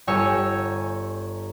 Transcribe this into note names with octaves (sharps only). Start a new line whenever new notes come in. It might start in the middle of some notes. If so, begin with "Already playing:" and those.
G1 G4 C#5 G#5 E6 C#7